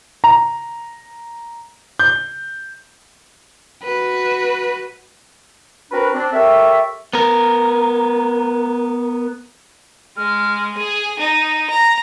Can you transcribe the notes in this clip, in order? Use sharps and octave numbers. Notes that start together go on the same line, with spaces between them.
A#5
G6
F#4 B4
C4 D4 F#4 A#4 B4
C4 D4
G4 A4 A#4 C#5 E5
B3 A#4
G#3 F6
G#4 D#7
D#4
A#5